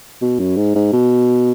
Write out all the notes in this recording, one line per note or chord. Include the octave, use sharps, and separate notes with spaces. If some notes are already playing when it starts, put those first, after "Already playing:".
B2
F#2
G#2
G#2
B2